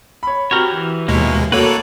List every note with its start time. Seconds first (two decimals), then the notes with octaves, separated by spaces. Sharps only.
0.23 C#5 B5
0.51 C4 F#4 G4 A#4 C#5
0.71 E3
1.08 D#2 B2 G#3 A#3 E4 C#5
1.52 A#3 F#4 A4 B4 C#5 D5